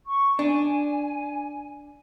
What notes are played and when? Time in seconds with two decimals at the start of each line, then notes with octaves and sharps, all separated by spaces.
0.06 C#6
0.39 D4 G#5